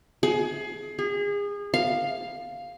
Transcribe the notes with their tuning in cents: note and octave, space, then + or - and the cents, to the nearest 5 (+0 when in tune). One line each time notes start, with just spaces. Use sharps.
G#4 +25
G#4 -30
F5 +5